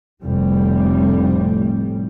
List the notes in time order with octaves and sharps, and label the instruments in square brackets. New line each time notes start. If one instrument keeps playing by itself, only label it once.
[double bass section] F1 A2 G3